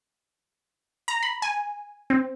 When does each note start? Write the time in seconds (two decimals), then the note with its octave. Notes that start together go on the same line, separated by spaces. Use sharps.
1.08 A#5
1.23 B5
1.42 G#5
2.10 C4